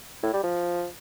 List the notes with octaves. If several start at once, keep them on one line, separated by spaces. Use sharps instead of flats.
A2
G3
F3